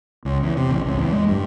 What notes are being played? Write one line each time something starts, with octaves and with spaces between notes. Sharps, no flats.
C#2
E2
C3
A1
C#2
E2
G#3
G2